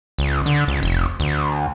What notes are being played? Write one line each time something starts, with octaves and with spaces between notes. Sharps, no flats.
C#2
D3
C#2
F1
D2